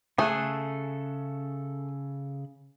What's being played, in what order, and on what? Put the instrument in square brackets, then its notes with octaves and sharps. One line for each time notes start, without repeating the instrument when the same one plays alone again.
[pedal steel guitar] C#3 A4 F#6 [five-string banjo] A3 G#4